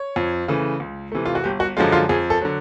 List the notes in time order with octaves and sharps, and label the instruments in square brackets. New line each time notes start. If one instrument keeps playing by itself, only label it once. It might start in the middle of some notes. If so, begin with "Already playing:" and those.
Already playing: [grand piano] C#5
F2
C#3 E3 A3
C#2
C3 E3 A3
F4
F#4
G1 G4
F#4
F#2 D3 F3 G#3 F4
F4
F2 G#4
A4
D3 F#3